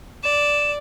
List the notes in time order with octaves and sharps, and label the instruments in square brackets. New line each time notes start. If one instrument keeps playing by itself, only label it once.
[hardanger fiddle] D5 [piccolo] E7